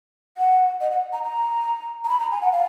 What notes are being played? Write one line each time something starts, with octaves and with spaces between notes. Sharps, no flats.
F#5
D#5
F#5
A#5
A#5
A#5
B5
A#5
G#5
F#5
F5